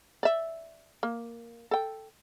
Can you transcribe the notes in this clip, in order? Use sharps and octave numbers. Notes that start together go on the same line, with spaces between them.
D5 E5
A#3
A4 G5